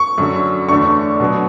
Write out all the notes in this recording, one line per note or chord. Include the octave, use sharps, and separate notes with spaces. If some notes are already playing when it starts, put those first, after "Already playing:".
Already playing: C#6
F#2 D3 F#3
E2 D3 A3 D4 C#6
B2 F#3 B3